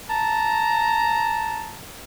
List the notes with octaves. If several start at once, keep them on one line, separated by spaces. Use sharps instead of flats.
A5 A#5